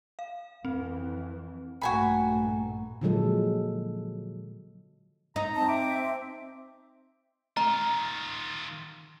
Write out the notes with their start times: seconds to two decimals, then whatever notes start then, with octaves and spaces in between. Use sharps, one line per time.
0.19 F5
0.65 F2 E3 C4
1.81 A#1 G2 A3 F#4 G5 G#5 A#5 B5
3.01 A#2 D3 F3 F#3 G#3 A4
5.36 D#4 A#5
5.55 C4 A5
5.68 E5 D6
7.57 D#3 F4 A#5